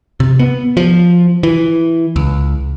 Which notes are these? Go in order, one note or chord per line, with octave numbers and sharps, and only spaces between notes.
C3
B3
F3
E3
C#2